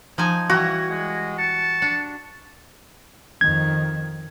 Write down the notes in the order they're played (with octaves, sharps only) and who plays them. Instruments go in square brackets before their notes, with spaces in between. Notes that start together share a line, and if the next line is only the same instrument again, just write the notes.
[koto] F3 D#4 G#5 [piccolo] G#6
[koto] E3 G3 [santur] F#4
[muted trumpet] G#3
[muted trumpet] A5 [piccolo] C#7
[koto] D4
[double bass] F2 D#3 [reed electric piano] G#6